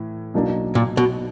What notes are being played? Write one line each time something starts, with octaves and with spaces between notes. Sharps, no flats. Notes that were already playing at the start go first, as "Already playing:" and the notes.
Already playing: A2 E3
B1 B2 F#3 A#3 D4
A#2
B2